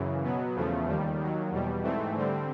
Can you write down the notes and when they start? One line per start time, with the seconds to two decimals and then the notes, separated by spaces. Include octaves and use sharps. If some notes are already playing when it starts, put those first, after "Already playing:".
Already playing: F#2 C#3 E3
0.24 B2 F#3 B3
0.56 E2 C#3 F3 A3
0.87 D#2 D#3 G3
1.19 D#2 D#3 F#3
1.51 E2 B2 G3
1.83 G#2 E3 A3 C4
2.15 D3 G3 C4